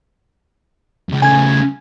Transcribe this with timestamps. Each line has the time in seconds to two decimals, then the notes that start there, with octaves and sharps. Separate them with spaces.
1.09 C#2 F#2
1.22 C#3 A3 G#5 G#6